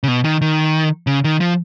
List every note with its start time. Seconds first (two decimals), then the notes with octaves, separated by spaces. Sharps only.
0.03 C#3
0.08 B2
0.24 D#3
0.42 D#3
1.07 C#3
1.24 D#3
1.41 F3